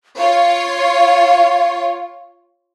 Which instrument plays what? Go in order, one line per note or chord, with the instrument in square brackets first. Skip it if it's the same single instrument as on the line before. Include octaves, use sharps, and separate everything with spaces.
[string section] F4 C#5 [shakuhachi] F5